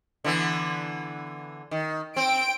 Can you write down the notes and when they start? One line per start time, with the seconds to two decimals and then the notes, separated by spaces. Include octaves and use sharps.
0.24 D3 E3 B3
1.71 D#3
2.16 C4 G5 D7